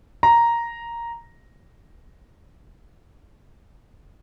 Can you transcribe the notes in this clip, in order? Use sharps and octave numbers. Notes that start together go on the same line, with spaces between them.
A#5